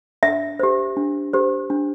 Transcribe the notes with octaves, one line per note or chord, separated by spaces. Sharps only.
D4 E5
G4 C5
D4
G4 C5
D4